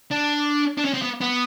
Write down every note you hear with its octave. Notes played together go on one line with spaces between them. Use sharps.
D4
D4
C#4
C4
B3
B3